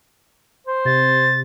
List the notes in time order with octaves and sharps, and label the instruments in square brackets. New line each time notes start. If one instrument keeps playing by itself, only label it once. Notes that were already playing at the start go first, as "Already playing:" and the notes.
[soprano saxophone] C5
[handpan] C3 [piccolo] A6